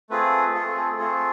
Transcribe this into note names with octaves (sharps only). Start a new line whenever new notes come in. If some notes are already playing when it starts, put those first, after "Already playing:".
A3 C4 F4 G#4 B4
A3 C4 F4 G#4 A4
A4
G#4
A3 C4 F4 G#4 A4